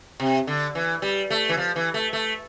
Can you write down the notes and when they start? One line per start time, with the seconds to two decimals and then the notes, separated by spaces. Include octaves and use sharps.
0.20 C3
0.47 D3
0.75 E3
1.02 G3
1.30 A3
1.49 E3
1.57 F3
1.76 E3
1.94 A3
2.13 A3